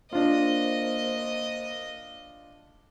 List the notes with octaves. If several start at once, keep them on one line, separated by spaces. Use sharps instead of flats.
A#3 D4 F4 C5 D#5